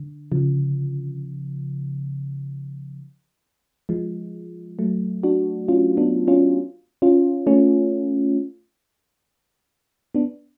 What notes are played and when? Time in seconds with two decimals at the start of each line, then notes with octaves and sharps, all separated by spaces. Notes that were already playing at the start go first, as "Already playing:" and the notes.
Already playing: D3
0.32 C#3 F3
3.89 F3 G#3
4.79 F#3 A3
5.23 D4 F#4
5.68 C#4 F4
5.97 B3 D4
6.28 C#4 F4
7.02 C#4 F4
7.47 A3 C#4
10.15 B3 D4